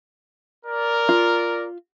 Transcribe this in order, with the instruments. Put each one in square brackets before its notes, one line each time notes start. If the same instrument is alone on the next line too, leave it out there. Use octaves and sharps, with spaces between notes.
[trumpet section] A#4 D5
[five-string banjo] F4